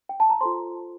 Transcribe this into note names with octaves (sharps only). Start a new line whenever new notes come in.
G5
A5
A#5
F4 A4 C5 C6